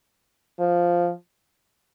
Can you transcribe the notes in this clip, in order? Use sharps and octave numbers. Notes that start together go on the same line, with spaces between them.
F3